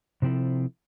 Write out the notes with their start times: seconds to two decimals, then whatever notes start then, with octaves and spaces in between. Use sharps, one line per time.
0.22 C3 F3 C4 E4 A4